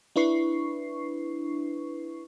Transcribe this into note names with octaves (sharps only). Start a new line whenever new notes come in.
D4 E4 B4 C#6 C7